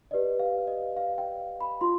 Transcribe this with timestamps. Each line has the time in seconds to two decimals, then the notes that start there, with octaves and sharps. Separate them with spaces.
0.11 G4 B4 D5 D#5
0.39 F5
0.67 D#5
0.97 F5
1.18 G5
1.61 B5
1.81 F4 C6